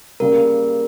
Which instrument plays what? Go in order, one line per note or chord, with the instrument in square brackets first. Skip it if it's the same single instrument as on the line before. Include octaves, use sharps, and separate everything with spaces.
[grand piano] C#3 G3 A#3 [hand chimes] A#4